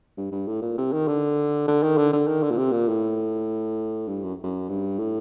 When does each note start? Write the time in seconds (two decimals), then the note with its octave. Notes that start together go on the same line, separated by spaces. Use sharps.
0.17 G2
0.32 G2
0.47 A2
0.62 A#2
0.78 C3
0.93 D#3
1.08 D3
1.68 D3
1.83 D#3
1.97 D3
2.13 D3
2.28 D#3
2.43 D3
2.51 A#2
2.58 C3
2.72 A#2
2.88 A2
4.08 G2
4.23 F#2
4.43 F#2
4.69 G2
4.99 A2